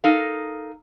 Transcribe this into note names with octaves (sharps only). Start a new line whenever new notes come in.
D#4 A4 A#4 F5